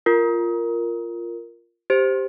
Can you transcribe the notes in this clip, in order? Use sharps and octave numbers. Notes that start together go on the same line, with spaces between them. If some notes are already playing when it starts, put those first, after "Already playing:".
F4 A#4
G4 C5